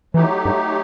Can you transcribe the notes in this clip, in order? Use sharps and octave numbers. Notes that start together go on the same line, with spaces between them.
E3 F#3 A3 D#4 G4
G2